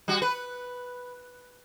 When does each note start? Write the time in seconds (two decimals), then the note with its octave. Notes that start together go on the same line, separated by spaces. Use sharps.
0.08 G3 F#4
0.22 B4